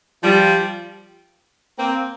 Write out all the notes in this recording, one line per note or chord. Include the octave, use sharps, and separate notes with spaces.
F3 G3
A#3 C4